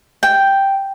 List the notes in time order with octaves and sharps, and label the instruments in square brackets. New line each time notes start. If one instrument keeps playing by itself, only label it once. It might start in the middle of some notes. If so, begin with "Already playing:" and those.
[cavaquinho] G5